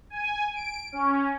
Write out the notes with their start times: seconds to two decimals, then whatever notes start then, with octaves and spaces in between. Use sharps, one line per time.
0.10 G#5
0.55 D7
0.92 C#4